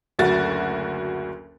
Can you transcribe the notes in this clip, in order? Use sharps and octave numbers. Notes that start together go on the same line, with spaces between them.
F#1 D2 F#4 A6